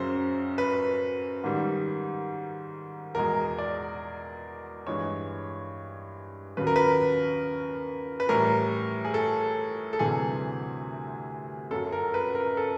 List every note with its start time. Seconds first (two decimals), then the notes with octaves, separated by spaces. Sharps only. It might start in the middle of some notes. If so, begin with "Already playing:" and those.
Already playing: F#2 C#3 F#3 C5
0.58 B4
1.44 G#2 D#3 G3
3.15 E2 B2 G#3 A#4
3.58 D5
4.87 G2 E3 G#3 C#5
6.57 D#2 C#3 F#3 B4
6.67 A#4
6.76 B4
8.20 B4
8.29 A2 E3 G3 A#4
9.05 G#4
9.14 A4
9.93 A4
9.99 D2 C3 E3 G3 G#4
11.71 F#2 C#3 F#3 A4
11.92 A#4
12.14 B4
12.35 A#4
12.57 A4